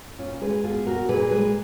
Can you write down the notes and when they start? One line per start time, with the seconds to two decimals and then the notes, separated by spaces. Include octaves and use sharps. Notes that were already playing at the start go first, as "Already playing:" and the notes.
0.19 A#2 C#4 F4
0.41 G#3 G#4 B4
0.64 B3 F4 G#4
0.87 A#2 F#4 A#4
1.09 A#2 G#4 B4
1.31 G#3 G#4 B4